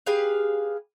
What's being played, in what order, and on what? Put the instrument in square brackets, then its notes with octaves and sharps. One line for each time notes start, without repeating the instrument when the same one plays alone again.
[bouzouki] G4 G#4 B4 F5